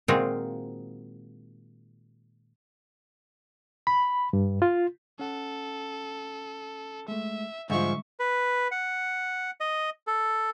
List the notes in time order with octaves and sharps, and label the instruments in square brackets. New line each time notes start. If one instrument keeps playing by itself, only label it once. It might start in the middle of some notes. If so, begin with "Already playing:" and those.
[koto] A#2 D#3 G#3 C4 F4 F#4
[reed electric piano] B5
G2
F4
[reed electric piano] C#4 F#5 [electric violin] A4
[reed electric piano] G#3 A3 [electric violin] E5
[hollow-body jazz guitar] G#2 F3 [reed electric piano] D3 G3 G#3 [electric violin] E5 C#6
[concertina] B4
F#5
D#5
A4